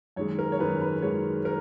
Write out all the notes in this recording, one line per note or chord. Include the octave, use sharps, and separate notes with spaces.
F#2 D#3 G#3 C#5
A#4
C#5
F#2 D#3 G#3 B4
B4
F#2 D#3 G#3 C#5
A#4